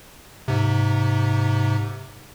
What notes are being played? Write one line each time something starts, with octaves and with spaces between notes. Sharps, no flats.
G#2 C3